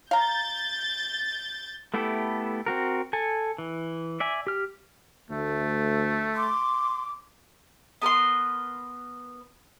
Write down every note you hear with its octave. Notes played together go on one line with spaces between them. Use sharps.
F5 A#5 G6 A6
A3 B3 E4 G4 A4
C4 F#4 A#4
A4 G#5
E3
D5 E5 G#5
G4 F6
D2 A3
C6 D6
B3 A#4 B4 C6